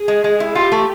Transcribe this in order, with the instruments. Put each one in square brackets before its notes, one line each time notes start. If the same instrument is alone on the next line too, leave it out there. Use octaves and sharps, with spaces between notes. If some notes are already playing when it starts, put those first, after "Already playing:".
Already playing: [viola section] G#4
[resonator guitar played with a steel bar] G#3
G#3
E4
[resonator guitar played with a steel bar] F4 [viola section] G4
[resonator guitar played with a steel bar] A3